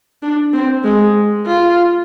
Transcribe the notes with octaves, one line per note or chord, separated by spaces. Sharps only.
D4
C4
G#3
F4